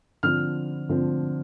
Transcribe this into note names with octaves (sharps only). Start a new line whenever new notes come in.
D3 F3 C4 F6
D3 F3 C4